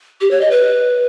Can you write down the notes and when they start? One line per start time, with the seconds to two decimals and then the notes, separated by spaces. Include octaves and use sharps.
0.21 G4
0.31 C#5
0.41 D#5
0.51 B4